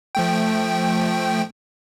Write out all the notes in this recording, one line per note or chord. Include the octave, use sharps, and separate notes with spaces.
F3 A3 G5